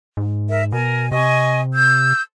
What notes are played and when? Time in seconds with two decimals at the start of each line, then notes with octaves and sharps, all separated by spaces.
0.17 G#2
0.49 A#4 E5
0.72 B2 A#4 G#5
1.12 C3 D#5 G#5 C#6
1.73 E6 G6